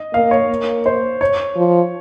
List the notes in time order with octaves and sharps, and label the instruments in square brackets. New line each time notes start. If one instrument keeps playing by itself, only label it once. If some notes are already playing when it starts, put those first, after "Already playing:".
Already playing: [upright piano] D#5
[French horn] A#3 [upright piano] F5
[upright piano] C#5
[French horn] A#3
[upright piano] C5
C#5
[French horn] F3